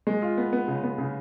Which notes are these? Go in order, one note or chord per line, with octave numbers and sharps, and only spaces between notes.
G#3
F4
B3
B3
C#3
B3
C#3